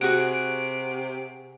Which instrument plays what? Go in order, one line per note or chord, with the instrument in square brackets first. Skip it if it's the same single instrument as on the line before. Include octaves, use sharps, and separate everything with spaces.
[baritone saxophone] C3 [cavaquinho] F#4 G#4 F#5 [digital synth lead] D7